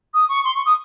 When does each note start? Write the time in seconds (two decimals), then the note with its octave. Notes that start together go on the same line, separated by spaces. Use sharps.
0.14 D#6
0.29 C#6
0.45 C6
0.55 C#6
0.66 D#6